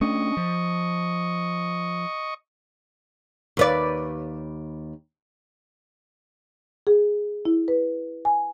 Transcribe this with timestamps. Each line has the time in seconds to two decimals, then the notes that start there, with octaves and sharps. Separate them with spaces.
0.01 A3 C#4 D4 D#5 C#6
0.37 F3
3.57 D#2 B4 D5
6.87 G#4
7.45 E4
7.68 B4
8.25 G#5